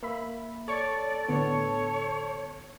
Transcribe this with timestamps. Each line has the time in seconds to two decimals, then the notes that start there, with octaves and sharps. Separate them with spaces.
0.03 A#3 E5 B5
0.68 A4 C#5 D5 C#6
1.29 A2 D3 B3 C#5